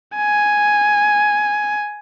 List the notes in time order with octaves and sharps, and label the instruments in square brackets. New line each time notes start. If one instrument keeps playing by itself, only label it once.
[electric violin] G#5